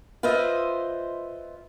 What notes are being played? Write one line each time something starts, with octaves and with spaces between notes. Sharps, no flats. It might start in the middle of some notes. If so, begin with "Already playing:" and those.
F4 B4 C5 D#5 E5